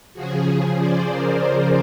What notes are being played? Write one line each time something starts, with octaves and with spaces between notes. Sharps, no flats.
C#3 F3 F#4 G#4
C5 D5
A#4 C5